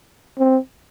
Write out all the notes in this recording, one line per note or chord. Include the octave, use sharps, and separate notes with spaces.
C4